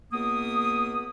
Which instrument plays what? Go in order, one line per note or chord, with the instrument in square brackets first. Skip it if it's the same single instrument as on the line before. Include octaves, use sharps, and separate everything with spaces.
[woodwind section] C#2 A#3 B3 D#6